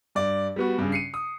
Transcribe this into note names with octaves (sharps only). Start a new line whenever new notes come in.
G2 D5
G3 B3 F#4
G2 C#3
C7 C#7 D#7
D#6